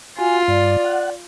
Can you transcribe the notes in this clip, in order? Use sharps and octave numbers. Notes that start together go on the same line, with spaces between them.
F4 F#4 G#5
G2 D5
F#5